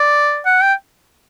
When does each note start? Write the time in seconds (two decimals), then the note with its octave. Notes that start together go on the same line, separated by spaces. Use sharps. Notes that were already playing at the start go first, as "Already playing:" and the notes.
Already playing: D5
0.46 F#5
0.62 G5